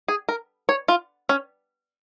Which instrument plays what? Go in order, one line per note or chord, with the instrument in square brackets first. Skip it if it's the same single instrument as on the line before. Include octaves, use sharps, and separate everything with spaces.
[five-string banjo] G#4
A#4
C#5
F4
C#4